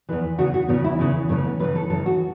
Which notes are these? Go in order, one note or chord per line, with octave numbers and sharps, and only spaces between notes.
E2 C#3 E3 B4
E2 C#3 E3 F#4
F#4
E2 C#3 E3 B3
E4
E2 C#3 E3
F#2 C#3 E3 A3
B3
F#2 C#3 E3 B4
A4
F#2 C#3 E3 A4
F#4